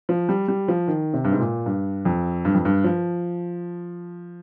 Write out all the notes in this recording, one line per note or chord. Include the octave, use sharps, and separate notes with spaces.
F3
G3
G3
F3
D#3
C3
G2
G#2
A#2
G2
F2
G2
F2
G2
F3